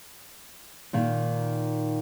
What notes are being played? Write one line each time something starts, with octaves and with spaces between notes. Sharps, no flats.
A#2 D#3